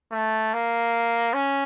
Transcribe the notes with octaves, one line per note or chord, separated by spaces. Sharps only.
A3
A#3
C#4